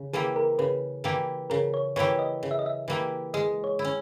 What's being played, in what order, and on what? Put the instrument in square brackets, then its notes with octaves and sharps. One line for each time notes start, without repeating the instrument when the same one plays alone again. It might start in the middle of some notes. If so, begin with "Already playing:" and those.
Already playing: [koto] C#3
[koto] E3 A#3 E4 G4 [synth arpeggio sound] G#4
[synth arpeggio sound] A#4
[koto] C#3 [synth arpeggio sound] B4
[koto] E3 A#3 E4 G4
[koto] C#3 [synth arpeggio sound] A#4
[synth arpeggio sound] C#5
[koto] E3 A#3 E4 G4 [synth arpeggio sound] C#5
[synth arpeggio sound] D#5
[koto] C#3
[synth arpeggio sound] E5
D#5
E5
[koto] E3 A#3 E4 G4
[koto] G#3 [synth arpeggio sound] D#5
[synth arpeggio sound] C#5
[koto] E4
C#4